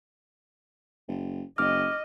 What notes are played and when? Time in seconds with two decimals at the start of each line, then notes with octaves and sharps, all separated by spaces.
1.08 F#1
1.58 F#1 D#5 D6 F6